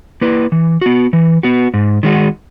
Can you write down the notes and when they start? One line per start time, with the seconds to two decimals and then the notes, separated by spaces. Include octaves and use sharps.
0.21 A#3 E4 B4
0.52 E3
0.81 B3 F#4
1.13 E3
1.43 B3 F#4
1.74 G#2
2.03 D#3 G#3 D#4 F#4